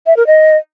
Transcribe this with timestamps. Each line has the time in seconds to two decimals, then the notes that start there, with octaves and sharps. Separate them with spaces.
0.07 E5
0.17 A#4
0.27 D#5